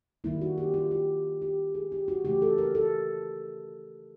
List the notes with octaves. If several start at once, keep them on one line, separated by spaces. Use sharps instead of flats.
D#3 G3 A#3 E4
F#4
G4
F4
G4
G4
G#4
G4
F#4
C#3 E3 A3 G4
A4
A#4
A4